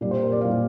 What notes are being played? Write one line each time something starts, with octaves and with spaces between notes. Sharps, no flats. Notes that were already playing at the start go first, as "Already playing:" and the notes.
A#2 G3 D5
C5
A#4
D5
A#2 G3 F5